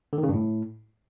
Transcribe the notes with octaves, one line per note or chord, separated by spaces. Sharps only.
D3
D#3
C#3
G2
A2